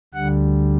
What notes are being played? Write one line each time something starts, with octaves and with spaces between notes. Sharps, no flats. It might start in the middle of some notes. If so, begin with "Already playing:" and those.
D2 D3 G3 F#5